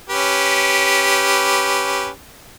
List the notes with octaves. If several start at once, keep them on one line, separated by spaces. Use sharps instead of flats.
C#4 G4 B4